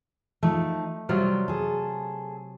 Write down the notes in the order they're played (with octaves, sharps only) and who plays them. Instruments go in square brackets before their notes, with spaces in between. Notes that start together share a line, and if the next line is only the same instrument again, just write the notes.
[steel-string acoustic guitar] F3 D#4 [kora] A3
[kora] C3 F#3 F4 [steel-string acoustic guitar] G3
[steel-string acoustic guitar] G#4 A4